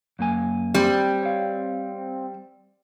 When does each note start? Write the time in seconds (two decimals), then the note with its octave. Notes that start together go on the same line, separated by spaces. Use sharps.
0.19 F#2 A#3 G#5
0.74 G3 C4
1.23 C#5 F5